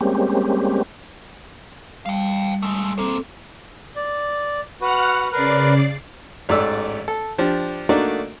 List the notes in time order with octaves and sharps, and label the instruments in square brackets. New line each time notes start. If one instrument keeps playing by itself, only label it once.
[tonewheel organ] G3 G#3 A#3 C4 C#4 G4
[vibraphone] G3 [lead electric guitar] F5 G5
[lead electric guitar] G#3 A3
[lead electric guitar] A#3 C5 [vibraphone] C4 A4
[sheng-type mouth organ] D5
[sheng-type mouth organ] F#4 B4 [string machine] F#5 F6
[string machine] C#3 D5 C7 [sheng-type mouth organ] A#4 B4
[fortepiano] A1 G#2 A3 D5 E6
A4
F3 D4 G4
A3 A#3 D4 D#4 F#4 D5